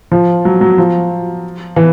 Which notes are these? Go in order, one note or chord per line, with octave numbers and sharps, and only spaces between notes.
F3
F#3
F#3
F3
E3